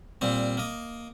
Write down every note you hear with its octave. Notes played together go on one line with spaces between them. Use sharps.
A#2 G3 C4
A#3 D#5